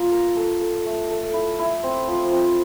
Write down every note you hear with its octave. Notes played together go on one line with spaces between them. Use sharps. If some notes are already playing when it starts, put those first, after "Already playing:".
Already playing: A#3 F4
A#4
A4
A4
A3
A4
E4
E4
C4
F3
C4